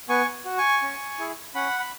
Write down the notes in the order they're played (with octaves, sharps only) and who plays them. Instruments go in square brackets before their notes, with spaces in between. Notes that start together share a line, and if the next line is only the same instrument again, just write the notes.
[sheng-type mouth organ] B3 G#5 C#6
F#4
G#5 C#6
C#4
E4 G#4
C#4 F#5 B5
B5